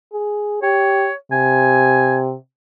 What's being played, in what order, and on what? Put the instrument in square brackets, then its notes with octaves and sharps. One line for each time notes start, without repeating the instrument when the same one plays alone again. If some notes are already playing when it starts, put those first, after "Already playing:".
[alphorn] G#4
[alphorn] G4 [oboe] C#5
[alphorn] C3 [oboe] G#5